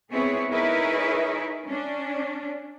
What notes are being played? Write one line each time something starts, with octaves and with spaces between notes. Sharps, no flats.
B3 C4 E4 G#4 B4 C#5
D#4 E4 G#4 A#4 B4 C#5
C#4 D4